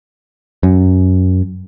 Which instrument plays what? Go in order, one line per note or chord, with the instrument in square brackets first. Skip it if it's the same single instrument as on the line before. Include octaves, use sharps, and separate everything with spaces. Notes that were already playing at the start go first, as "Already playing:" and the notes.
[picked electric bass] F#2